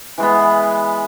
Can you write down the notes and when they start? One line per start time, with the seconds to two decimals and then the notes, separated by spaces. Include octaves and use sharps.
0.18 E3 G#3 B3